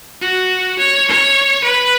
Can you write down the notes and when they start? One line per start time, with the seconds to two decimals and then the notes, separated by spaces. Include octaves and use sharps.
0.21 F#4
0.78 C#5
1.08 C#5
1.64 B4